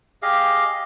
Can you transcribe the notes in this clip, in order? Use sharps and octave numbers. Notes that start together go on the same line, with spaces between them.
G4 G#4 D#5 F5